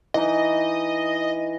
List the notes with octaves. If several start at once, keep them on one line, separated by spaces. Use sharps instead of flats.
E3 D#4 D#5